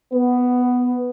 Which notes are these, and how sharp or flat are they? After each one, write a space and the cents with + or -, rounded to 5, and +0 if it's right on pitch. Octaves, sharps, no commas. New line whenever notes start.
B3 +5